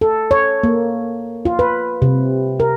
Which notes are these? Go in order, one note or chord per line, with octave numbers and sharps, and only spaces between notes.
A4
C#5
A#3
F4
B4
C3
A#4